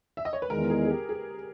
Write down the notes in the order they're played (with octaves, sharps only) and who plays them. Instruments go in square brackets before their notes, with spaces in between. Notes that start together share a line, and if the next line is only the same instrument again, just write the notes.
[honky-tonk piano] E5
D#5
C#5
B4
[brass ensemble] E2 D#3 G#3 [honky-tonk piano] A#4
[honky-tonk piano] G#4
G#4
G4
G#4